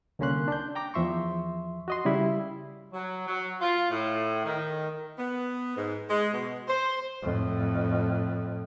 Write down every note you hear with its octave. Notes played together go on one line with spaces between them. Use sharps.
C2 D3 A#3 C#4 C6 F#6
D4 G6
G5 A#5 D6
E2 F3 E5 C6 C#6
F#4 D#5 C6
C#3 G3 E4
F#3
F#3
F4
A2
D#3
B3
G#2
G#3
B2
C5
F2 A2